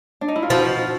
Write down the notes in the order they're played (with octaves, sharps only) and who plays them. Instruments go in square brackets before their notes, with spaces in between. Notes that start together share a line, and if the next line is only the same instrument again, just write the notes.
[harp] D4
D#4
E4
F4
[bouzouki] F3 [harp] E4 F#4